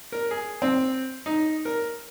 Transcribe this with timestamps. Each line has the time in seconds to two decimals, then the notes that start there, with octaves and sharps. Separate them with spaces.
0.12 A#4
0.31 G#4
0.62 C4
1.26 D#4
1.65 A#4